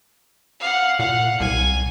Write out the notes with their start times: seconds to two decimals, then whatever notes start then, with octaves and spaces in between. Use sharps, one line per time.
0.60 F5 F#5
0.99 A#2 F5 F#5
1.40 C2 G#5